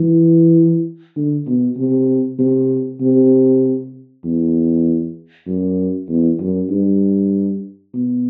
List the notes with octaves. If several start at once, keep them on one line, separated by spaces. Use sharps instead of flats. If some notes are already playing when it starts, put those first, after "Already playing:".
Already playing: E3
D3
B2
C3
C3
C3
E2
F#2
E2
F#2
G2
B2